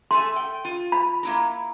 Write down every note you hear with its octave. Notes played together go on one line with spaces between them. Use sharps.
A3 A4 G#5 C6
G5
F4
B5
A#3 E4 A#5